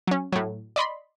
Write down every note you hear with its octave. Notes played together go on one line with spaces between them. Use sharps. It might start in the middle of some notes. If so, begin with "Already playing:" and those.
F#3 C#4
A2 F#3
D5 D#5 B5 C6